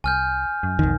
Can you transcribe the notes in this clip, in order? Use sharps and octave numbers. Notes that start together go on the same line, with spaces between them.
C2 G#5 F6 G6
F#2
B1 F2 D#3